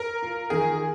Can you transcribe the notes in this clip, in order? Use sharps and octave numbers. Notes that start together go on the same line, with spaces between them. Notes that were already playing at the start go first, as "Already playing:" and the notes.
Already playing: A#4
F4
D#3 G#4